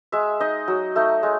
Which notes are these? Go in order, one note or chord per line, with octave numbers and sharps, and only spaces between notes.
G#3 E5
D#4 D#5
F#3
A3 D#4
G#3